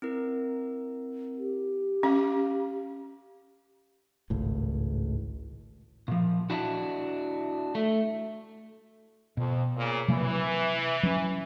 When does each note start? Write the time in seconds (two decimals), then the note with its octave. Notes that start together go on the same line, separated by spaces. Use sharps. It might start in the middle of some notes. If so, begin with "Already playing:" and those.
0.02 C4 E4 A#4
1.38 G4
2.03 C#4 F5 D6
4.30 G#1 C#2 A2
6.08 A#2 F3
6.50 D4 E4 F#4
7.75 A3
9.37 F2 B2
9.78 A#2 C#3 A#3
10.08 C3 E3 F#3 A#3
11.03 F#3 C#4